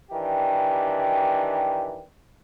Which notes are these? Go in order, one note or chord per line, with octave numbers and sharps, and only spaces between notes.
D#3 E3 D4 G4